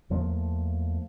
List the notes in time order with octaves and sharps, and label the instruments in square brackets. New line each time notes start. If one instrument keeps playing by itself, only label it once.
[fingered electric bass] E2 F3 A3 A#3